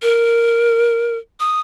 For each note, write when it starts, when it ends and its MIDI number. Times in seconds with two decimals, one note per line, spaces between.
0.02 1.18 70
1.40 1.60 87